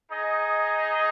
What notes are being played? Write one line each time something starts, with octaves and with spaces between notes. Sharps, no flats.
D#4 G#4 D#5